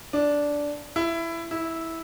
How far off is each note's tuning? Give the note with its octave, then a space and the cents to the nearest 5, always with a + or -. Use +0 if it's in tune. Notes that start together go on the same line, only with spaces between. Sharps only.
D4 -10
E4 +15
E4 -10